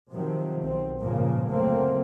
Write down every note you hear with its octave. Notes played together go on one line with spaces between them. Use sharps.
C3 D#3 F3 F#3
B1 C4
G#1 G2 A#2 C#3 F3 A#3
F#1 D2 F#3 A3 A#3 C4